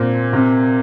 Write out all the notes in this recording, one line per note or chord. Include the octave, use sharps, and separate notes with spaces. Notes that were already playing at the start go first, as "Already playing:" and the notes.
Already playing: A#2 C4
C3